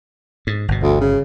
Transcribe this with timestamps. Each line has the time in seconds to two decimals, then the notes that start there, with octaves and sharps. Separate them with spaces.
0.47 G#2
0.68 G1 B2
0.82 D2
1.01 C#3